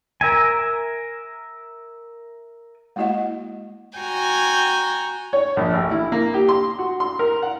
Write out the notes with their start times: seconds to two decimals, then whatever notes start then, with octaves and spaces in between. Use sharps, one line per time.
0.21 A#4 E5 G#5
2.96 G#3 A#3 E4 F#4 D#5 F#5
3.99 F#4 G5 G#5 A#5
5.33 C#5
5.57 A#1
5.73 A1
5.91 E4
6.12 A#3
6.34 G4
6.48 C6
6.79 F#4
7.00 C6
7.19 A#4
7.42 F#5